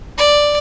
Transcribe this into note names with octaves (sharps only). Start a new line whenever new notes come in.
D5